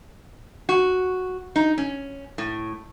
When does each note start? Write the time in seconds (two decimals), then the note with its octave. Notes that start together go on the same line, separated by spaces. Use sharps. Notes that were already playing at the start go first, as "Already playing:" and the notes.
0.69 F#4
1.56 D#4
1.78 C#4
2.38 A2